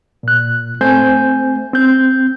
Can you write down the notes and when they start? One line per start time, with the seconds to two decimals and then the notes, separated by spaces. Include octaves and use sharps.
0.23 A#2 F#6
0.81 A3 C4 C5 G#5 G6
1.73 C4 G6